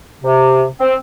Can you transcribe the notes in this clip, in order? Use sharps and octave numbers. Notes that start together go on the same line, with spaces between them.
C3
C4